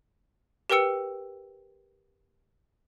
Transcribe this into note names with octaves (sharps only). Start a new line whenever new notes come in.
G4 A#4 B4 G5 E6 C#7